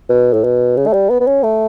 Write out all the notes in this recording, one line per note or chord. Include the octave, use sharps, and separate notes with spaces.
B2
A2
B2
C#3
A3
G3
B3
B3
C#4
A3